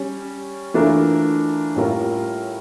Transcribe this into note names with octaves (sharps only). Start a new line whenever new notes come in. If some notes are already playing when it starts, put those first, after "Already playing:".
Already playing: G3 C#4
E3 A3 D4 F4 A#4
A2 G3 C#4 F4 A#4